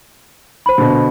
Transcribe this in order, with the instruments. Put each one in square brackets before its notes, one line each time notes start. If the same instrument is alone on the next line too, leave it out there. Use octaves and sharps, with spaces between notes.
[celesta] C5 B5
[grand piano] B2 D3